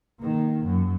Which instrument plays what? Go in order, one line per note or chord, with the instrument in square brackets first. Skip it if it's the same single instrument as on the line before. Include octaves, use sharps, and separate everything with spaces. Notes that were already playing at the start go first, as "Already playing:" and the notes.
[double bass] D#3 A#3
F#2